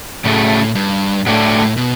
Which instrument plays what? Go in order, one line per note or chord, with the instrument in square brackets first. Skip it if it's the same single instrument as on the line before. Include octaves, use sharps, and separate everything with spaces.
[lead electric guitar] A2 [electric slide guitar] C#3 F#3 A3
[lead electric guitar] G2
[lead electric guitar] A2 [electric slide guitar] F#3 A3 D4 G4
[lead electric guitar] B2